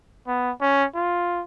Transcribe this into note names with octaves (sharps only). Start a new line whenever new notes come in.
B3
C#4
F4